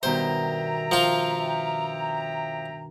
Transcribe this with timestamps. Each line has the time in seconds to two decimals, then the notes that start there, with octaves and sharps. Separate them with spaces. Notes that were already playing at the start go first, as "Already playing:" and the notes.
0.03 G2 B2 D#3 C5 E5 G5 A#5
0.91 F3 F4